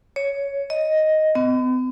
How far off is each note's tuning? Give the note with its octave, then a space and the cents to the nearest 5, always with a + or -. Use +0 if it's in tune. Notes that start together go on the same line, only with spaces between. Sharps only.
C#5 +10
D#5 +5
B3 +45